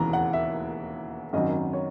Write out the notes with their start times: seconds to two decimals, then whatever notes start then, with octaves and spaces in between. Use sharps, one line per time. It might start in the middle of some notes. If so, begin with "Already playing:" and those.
Already playing: E1 D#2 C#3 E3 A#5
0.13 F#5
0.33 E5
1.33 G#1 F#2 D#3 F#3 D#5
1.73 C#5